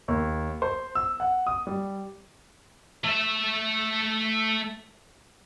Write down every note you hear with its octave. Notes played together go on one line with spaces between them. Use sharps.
D#2
C5
E6
F#5
D#6
G3
A3 E5